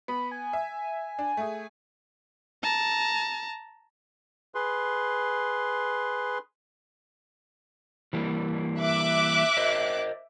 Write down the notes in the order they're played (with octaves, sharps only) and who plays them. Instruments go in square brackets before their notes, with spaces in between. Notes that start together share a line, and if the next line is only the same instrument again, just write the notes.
[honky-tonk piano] B3 [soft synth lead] B5
[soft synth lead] G#5
[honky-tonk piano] E5
D4
A3 G#4
[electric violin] A5 A#5
[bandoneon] G#4 B4 C6
[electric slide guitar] E3 G3 A#3
[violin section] E5 D6 F#6
[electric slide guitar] A#4 C5 D#5